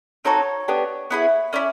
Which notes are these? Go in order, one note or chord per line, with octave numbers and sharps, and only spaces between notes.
C4 D#4 F#4 A4 C#5
B3 D4 G4
B3 E4 G#4
C#4 E4 D5